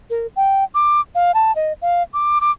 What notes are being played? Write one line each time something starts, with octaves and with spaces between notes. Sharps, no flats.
A#4
G5
D6
F5
A5
D#5
F5
D6
D6